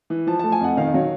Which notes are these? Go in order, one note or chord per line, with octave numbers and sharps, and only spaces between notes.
E3
F3 A5
A3 A5
G#5
F2 F#5
D#3 F5
F#3